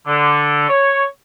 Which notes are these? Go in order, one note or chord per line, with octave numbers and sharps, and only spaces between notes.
D3
C#5